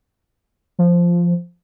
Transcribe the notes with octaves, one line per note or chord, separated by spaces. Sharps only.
F3